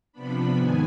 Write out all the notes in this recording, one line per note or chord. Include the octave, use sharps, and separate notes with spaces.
C3 F3 B3 D4 B5
G#2 D#3 B3 G#5